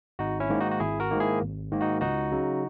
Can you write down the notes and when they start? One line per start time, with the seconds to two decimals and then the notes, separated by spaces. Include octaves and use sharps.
0.19 G#1 D#4 F#4
0.40 C#4 E4
0.50 G#2 D#3 A#3
0.60 D#4 F#4
0.71 F#4
0.80 G#1 E4 G#4
1.00 F#4 A#4
1.11 G#2 D#3 A#3
1.20 E4 G#4
1.41 G#1
1.72 G#2 D#3 A#3
1.81 D#4 F#4
2.01 C#2 D#4 F#4
2.32 C#3 F#3